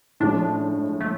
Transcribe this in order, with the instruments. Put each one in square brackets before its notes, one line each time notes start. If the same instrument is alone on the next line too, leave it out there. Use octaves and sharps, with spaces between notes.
[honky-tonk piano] A2 F3 G#3 C#4 [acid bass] D4
[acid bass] A3